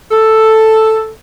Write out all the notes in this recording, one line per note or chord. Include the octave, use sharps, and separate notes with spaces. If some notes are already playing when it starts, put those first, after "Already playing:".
A4